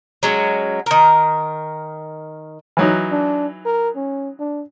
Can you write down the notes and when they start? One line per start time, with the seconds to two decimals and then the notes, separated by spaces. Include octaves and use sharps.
0.23 F#3 G#3 C#4
0.86 D#3 A#4
2.77 E3 F#3 D#4
3.11 D4
3.65 A#4
3.95 C#4
4.39 D4